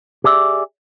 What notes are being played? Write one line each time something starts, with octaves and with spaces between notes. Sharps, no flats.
G4 G#4 D5 E5